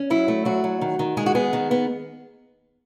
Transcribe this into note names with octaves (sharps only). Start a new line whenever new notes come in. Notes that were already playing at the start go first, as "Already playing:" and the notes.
Already playing: C#4
F#3 E4
A3
F#3 F#4
F#3
D#3
D#3
G#3 G#4
F#4
B3 G#4
D#3
B3